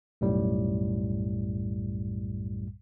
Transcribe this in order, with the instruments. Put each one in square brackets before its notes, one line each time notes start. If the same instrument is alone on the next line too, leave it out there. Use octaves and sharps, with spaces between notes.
[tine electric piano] B1 F#2 A2 G3